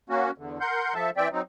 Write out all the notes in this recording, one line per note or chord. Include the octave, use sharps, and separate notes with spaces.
A#3 C#4 F#4
E2 D3
A#4 F#5 C6 G6
F3 A4 E5 A5
E3 C4 D5 E5 G5
F#3 C4 D#4